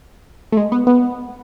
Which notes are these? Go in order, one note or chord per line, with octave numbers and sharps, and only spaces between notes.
A3
G#3
B3
B3